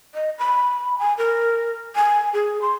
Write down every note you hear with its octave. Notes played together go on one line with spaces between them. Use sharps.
D#5
B5
G#5
A#4
G#5
G#4
C6